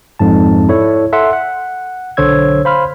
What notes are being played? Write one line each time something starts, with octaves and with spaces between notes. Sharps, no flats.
F2 G#2 A5
E4 A4 C#5 D5
A4 E5 F#5 C6 E6
F#5
B1 D3 C5 C#5 E6 G#6
C5 F5 B5 C6 F6